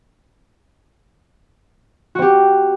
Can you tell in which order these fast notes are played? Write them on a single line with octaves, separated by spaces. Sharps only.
F#4 C4 G4